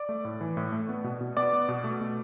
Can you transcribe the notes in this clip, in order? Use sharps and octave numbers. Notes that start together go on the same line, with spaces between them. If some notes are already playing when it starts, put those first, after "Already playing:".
Already playing: D5 D6
A3
A2
E3
A2
A3
B3
B2
B2
B3 D5 D6
B3
B2
A3
B2